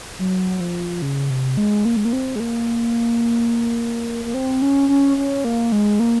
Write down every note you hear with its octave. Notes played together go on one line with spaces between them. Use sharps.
F#3
F3
C#3
C3
G#3
A#3
G#3
A#3
C4
G#3
A#3
A#3
C4
C#4
C#4
C#4
A#3
G#3
A#3